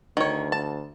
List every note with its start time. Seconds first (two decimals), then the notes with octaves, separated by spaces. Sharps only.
0.17 D2 D#3 C#5
0.52 A5